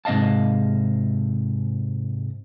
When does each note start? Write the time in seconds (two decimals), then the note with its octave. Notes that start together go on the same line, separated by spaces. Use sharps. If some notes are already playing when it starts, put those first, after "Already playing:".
0.05 G#2 C3 D#5 F5 A5